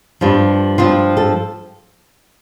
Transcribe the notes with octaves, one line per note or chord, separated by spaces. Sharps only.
G2 F3
G2 F3 F4
A4